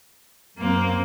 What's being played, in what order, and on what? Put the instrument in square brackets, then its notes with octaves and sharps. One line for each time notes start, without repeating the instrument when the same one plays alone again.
[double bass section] F#2 [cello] A#3 C4